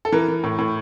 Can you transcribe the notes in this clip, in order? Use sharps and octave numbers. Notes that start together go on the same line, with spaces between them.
A4
E3 A#4
E3
A2
A2